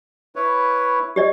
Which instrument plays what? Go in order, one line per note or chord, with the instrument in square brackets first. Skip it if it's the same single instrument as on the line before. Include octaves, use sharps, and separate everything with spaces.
[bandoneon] E4 B4 C#5
[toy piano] G4 D5 D#5